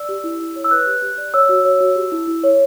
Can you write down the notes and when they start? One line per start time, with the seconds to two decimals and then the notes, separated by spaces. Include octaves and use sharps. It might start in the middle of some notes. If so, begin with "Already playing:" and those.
Already playing: D5 E6
0.09 G4
0.24 E4
0.40 E4
0.56 C#5
0.64 E6
0.71 B4 F#6
0.87 G4
1.02 G4
1.18 D5
1.34 C#5 E6
1.49 F#4
1.65 C#5
1.80 F#4
1.96 G4
2.12 E4
2.27 E4
2.44 C#5